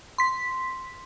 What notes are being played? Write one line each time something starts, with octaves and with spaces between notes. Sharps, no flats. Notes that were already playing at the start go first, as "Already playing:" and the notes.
C6 B6